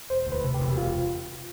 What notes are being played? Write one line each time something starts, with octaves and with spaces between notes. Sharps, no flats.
E1 C5
D2
B4
C3
G4
E1
E1 F4